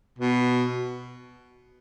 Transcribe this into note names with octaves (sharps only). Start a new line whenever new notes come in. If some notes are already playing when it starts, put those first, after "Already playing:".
B2